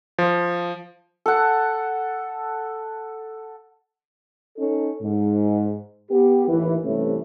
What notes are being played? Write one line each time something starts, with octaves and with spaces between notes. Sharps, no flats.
F3
A4 F#5
C#4 D#4 A4
G#2
B3 G4
D#2 A2 E3
G2 C3 E3 A3 C#4